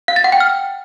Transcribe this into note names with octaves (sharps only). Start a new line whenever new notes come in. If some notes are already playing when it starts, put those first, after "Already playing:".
F5
A6
F#5
G5
F6